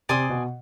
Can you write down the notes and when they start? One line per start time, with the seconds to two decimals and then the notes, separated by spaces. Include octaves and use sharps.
0.09 C3 D5 G#5 C6 D#6
0.30 B2